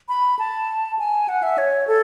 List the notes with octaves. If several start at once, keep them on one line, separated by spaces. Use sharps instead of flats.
B5
A5
G#5
F#5
E5
C#5
A4